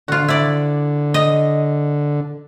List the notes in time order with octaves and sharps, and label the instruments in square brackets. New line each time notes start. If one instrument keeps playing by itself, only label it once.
[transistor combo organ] D3 [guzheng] F4 F#4
[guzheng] E4 D5
D#5